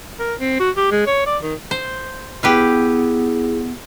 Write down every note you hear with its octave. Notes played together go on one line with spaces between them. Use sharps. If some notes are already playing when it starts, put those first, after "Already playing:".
A#4
C4
F#4
G4
G#3
C#5
D5
D#3
C5
B3 E4 G4 G#4 B4 F5